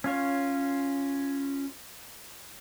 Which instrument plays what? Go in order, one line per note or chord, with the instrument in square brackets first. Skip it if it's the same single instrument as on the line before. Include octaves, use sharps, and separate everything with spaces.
[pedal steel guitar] C#4 F4 C#5